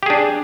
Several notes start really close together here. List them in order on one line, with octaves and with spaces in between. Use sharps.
G4 G#4 D4